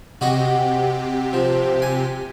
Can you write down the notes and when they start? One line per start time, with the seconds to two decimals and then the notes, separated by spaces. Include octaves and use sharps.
0.21 C3 F#4 G4 D#5 C#6
1.33 F3
1.82 G#5